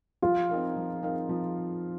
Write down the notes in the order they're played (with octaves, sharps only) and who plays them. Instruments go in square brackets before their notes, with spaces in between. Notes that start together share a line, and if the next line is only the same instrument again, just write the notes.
[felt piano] F3 [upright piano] F4
[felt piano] C4 D#4 A#4 F5
F3
C4 D#4 A#4 F5
F3